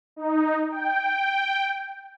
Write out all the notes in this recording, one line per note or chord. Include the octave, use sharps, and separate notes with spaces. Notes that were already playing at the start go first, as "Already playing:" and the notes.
D#4
G5